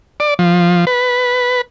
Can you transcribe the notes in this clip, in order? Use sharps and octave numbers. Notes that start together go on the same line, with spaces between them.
D5
F3
B4